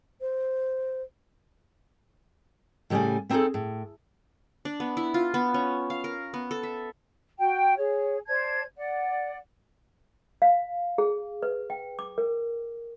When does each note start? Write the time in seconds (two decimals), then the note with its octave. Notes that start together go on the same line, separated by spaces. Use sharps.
0.21 C5
2.90 A2 C#3 G3 A3 D5 G#5
3.30 B3 C4 D#4 F#4 G#4 A4
3.54 A2
4.65 D4
4.80 B3
4.97 E4
5.14 F4
5.34 B3
5.54 C#4
5.90 F5
6.04 A#4
6.34 B3
6.51 A4
6.63 E5
7.39 F#4 G5
7.76 G#4 C#5
8.27 C5 D5 A5 G#6
8.76 D5 F#5
10.42 F5
10.98 G#4
11.42 B4
11.70 G5
11.99 D6
12.18 A#4